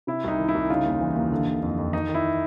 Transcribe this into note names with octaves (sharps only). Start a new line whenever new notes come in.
C3 E4
C2 D#4
D#3
E4
C2
C#3 D#4 F4
D#2
E3
D#2
D3
D3
F2
F2
D#3 D#4
D#3
E4